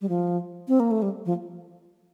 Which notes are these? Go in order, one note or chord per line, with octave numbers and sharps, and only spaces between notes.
G3
F3
C4
A#3
A3
G3
F3